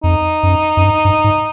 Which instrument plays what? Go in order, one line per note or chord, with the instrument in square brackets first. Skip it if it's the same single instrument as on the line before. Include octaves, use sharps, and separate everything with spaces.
[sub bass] F2 [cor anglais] D#4
[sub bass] F#2
F#2
G2
G2
G#2